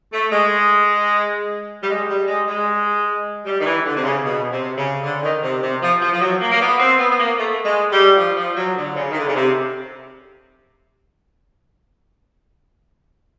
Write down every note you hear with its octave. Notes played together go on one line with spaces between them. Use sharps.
A3
G#3
G3
G#3
G3
G#3
G#3
G3
D#3
E3
D3
C3
C#3
B2
C3
C#3
D3
D#3
C3
C3
F3
F3
F3
F#3
A#3
A#3
B3
C4
B3
B3
A#3
A3
G#3
G3
F3
F3
F#3
D3
C#3
D#3
D3
C#3
C3